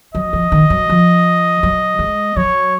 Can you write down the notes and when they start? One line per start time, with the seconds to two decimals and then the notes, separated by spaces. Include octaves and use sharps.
0.15 F#3 D#5
0.33 F3
0.52 D#3
0.70 F#3
0.89 F3
1.63 F#3
1.99 G#3
2.36 F#3 C#5